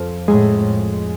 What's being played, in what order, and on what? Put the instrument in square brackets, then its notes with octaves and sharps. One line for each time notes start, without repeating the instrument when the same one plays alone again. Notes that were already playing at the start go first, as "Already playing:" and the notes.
Already playing: [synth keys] F2
[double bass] A2 [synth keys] G#3